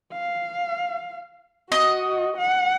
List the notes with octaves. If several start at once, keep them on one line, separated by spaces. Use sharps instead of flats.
F5
F#4 D#5
F#5